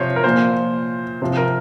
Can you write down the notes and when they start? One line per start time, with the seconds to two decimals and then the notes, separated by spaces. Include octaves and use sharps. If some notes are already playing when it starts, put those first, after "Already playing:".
Already playing: C3 F3 C5 C#5
0.16 A#4
0.24 A#2 F3 C5
1.22 C3 F3 C5
1.37 A#4